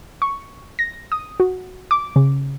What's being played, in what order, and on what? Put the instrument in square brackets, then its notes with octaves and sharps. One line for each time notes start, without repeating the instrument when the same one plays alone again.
[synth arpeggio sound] C#6
A#6
D#6
F#4
D6
C#3